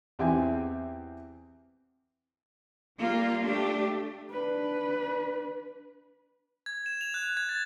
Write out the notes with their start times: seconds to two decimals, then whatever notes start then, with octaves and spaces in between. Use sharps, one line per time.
0.19 E2 C4 G4 E5 G5 G#5
2.97 G3 A#3 F4
3.43 A3 D4 G4
4.31 D4 B4
6.66 G#6
6.86 E7
7.01 F7
7.14 F#6
7.37 G#6
7.49 A6